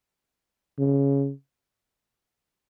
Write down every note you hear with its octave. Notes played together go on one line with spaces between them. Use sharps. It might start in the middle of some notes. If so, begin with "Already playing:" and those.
C#3